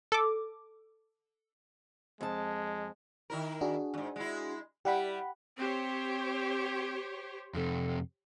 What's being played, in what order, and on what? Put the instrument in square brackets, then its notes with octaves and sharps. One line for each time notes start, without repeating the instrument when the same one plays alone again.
[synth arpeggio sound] A4 D6
[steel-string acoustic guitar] F2 A5 [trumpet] G#3
[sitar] D#3 E4 A#4
[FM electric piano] D4 F#4 G#4
[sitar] E2 G#2
G#3 E4
[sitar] G3 E4 [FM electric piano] G4 F#5 B5
[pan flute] C4 [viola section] G4 C5 C#5
[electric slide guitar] F2 C3 [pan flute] A4